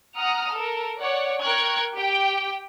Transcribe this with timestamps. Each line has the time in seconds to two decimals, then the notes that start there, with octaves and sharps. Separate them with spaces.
0.17 F#5 A#5 D#6 F6
0.51 A4 A#4
0.99 C#5 D5 F#5
1.41 A#4 G5 C#6 F#6 G#6
1.95 G4 G5